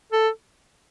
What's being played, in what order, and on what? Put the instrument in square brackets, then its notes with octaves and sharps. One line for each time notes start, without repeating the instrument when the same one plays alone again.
[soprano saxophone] A4